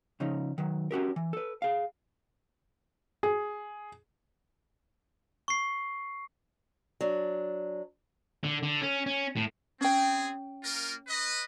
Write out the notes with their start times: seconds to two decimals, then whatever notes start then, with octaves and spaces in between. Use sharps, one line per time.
0.20 C#3 F3 C#4 D#4
0.58 D#3 F#3
0.91 C#4 F#4 G4 A#4
1.16 E3
1.33 A4 B4
1.62 G#4 F5
3.23 G#4
5.48 C#6 C7
7.01 F#3 D4
8.44 D3
8.63 D3
8.81 C#4
9.06 C#4
9.37 A2
9.81 C4 C#4 G#4 G5
10.64 A#3 F4 A#4
11.08 B4 D#5